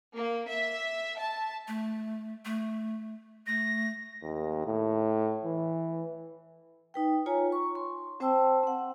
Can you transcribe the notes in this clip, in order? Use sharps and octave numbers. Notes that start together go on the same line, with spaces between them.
A#3
E5
A5
A3
A3
A3 A#6
D#2
A2
E3
D#4 B4 G5
F4 C#5 G#5 A#5
C#6
C6
C4 C5 G5 A5 E6
C4 F#5